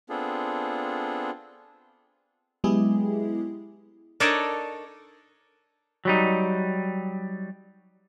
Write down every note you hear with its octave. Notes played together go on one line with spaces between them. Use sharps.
B3 C4 D4 F4 G#4 A4
F#3 G#3 B3 E4 G4 G#4
D4 D#4 A4 A#4 C#5 D5
F#3 G3 D#4